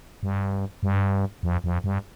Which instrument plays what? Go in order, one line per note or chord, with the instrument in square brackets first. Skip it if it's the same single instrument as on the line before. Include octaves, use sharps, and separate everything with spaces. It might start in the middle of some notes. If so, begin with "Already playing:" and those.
[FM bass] G2
G2
F2
F2
G2